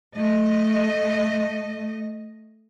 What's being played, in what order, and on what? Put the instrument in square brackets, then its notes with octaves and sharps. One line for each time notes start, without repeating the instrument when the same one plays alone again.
[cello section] A3 D#5